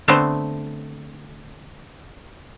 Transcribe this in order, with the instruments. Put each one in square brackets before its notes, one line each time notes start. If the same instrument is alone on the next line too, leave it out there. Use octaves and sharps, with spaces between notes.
[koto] D3 A3 B3 C4 C5